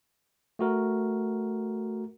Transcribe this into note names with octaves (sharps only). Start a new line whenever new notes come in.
A3 F#4 A#4